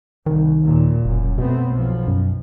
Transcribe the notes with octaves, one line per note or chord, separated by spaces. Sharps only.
C2 D#3
D#2 A#2
E1 F#2
B2 A3 B3 C4
B1 F3
F#2